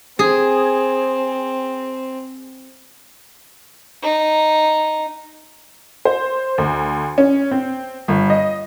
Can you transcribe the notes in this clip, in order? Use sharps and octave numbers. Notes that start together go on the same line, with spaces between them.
C4 G#4
D#4
C5
D2
C#4
C4
G1
D#5